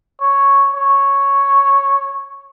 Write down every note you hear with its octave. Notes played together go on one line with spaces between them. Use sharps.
C#5
C#5